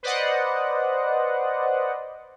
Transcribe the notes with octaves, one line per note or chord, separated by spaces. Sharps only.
B4 C5 D5 D#5 F#5